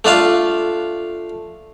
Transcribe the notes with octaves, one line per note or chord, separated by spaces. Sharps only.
A3 D4 F4 F5